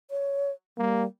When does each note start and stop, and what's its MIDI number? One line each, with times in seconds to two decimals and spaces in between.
0.11 0.51 73
0.78 1.05 55
0.78 1.04 58